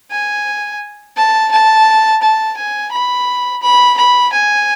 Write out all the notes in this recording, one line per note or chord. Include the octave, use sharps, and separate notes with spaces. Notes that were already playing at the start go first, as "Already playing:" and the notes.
G#5
A5
A5
A5
G#5
B5
B5
B5
G#5